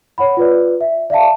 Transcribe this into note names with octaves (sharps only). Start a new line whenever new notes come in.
C#5 F#5 B5
F4 B4 D5
E5
D5 E5 F5 A5